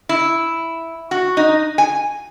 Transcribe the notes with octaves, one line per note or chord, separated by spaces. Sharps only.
E4
F#4
D#4
G#5